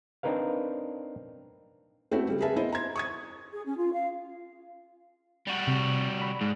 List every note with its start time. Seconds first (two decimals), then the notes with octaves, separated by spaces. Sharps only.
0.23 C4 D4 D#4 A#4 B4 F5
2.11 A3 C4 C#4 E4 F#4 B4
2.28 C#3 G3 G#3
2.40 G#4 A#4 B4 E5 A5
2.56 B3 E4 C5 D#5
2.72 A#5 C6 G#6
2.96 C#6 D#6 G#6
3.52 G#4
3.66 C#4
3.78 F4
3.93 F5
5.47 G3 F#4
5.67 C3
6.22 B5
6.41 G#2 G#3